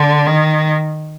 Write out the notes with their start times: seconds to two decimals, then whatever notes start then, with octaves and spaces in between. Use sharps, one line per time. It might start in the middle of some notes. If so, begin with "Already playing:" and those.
Already playing: D3
0.27 D#3